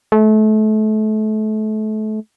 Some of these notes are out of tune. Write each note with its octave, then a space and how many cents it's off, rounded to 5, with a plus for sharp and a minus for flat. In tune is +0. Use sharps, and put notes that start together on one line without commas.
A3 -30